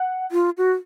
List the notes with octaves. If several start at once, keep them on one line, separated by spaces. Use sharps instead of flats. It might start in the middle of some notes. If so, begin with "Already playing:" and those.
Already playing: F#5
F4
F#4